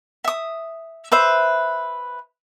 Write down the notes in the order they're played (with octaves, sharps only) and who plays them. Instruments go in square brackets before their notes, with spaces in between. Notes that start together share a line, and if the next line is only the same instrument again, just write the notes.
[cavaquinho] E5 D#6
B4 C5 E5